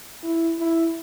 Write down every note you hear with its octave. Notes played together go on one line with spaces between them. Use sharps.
E4
E4